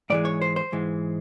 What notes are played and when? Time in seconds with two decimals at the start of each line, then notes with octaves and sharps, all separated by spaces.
0.10 G#2 E3 G#3 D5
0.25 C#5
0.42 C5
0.56 C5
0.72 G#2 E3 G#3